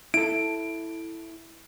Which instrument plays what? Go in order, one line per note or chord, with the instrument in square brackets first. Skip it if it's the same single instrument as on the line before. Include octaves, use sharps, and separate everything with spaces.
[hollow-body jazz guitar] E4 A4 [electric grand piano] D7